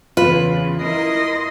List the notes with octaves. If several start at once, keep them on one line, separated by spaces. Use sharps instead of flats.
E2 C#3 F4 B4
E4 A#4 D#5 C6